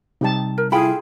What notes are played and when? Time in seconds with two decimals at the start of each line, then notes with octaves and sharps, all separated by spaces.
0.21 C3 G3 D#4 G4 A5
0.58 A#4
0.72 E4 F4 G#4 A4 F5 G5 B5